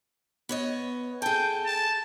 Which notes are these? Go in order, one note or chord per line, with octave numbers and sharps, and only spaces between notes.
B3 C#5 D#5
G#4 A4 G5
A5